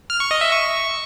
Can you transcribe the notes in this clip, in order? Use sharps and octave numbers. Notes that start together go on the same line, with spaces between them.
F6
C#6
D#5
E5
C#6